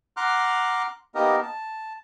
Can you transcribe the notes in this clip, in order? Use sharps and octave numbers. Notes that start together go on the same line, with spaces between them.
F#5 A#5 C6 D6 F6 F#6
A#3 B3 D#4 G4 A#4 D#5
A5